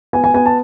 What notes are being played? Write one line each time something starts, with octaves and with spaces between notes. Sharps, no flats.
B3 G#5
G#5
B3 G#5
A5